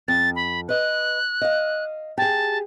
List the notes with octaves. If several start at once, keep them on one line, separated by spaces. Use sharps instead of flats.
F2 A6
B5
B4 D#5 F#6
D#5 F5
G4 G#4 A5